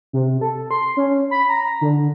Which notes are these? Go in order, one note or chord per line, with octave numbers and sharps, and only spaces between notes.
C3
A4
C6
C#4
B5
A#5
D3